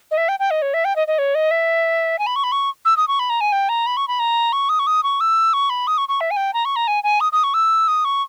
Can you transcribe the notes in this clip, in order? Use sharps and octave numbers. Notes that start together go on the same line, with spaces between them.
D#5
E5
G5
G5
D#5
C#5
E5
G5
D#5
D#5
C#5
D#5
E5
G#5
B5
C#6
B5
C#6
E6
D#6
C#6
B5
A#5
G#5
G5
A#5
B5
C#6
B5
A#5
C#6
D#6
C#6
D#6
C#6
E6
C#6
B5
D#6
C#6
C#6
E5
G#5
G5
A#5
C#6
A#5
G#5
G#5
D#6
D#6
C#6
E6
D#6
C#6